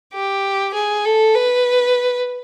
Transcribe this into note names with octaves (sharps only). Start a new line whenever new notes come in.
G4
G#4
A4
B4